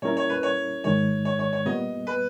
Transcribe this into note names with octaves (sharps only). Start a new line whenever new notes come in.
A#2 G3 C#4 E4 A#4 C#5
C#5
B4
C#5
G#2 D#3 G#3 C#5
C#5
C#5
C#5
A#2 G3 B3 D#5
B4